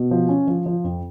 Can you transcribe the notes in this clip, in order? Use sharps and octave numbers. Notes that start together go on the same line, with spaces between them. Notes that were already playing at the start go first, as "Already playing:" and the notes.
Already playing: B2
F3
C#4
F3
F3
F2